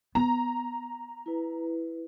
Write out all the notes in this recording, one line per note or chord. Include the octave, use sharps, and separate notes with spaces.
B3 A#5
E4 B4